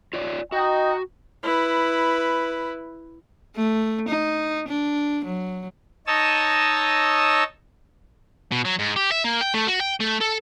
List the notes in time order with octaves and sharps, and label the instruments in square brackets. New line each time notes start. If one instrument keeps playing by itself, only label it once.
[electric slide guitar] F4 C#5 D5
[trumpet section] D#4 G5 [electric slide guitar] F#4 [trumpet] D#5
[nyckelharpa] E4 B4
[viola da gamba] A3
D#4
D4
F#3
[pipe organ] D#4 C#5 D#5 A5 E6
[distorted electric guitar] B2
F#3
G#2
G4
E5
A#3
G5
A3
F#4
G5
A3
A4